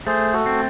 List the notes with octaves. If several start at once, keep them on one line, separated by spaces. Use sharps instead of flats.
A3 G#4 C5
F#4 A4
C4